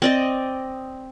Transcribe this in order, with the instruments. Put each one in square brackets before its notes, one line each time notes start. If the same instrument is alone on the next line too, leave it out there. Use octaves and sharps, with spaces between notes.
[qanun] C4 D5 D#5